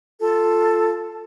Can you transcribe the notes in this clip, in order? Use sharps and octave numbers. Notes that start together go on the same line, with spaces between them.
F4 A4 A5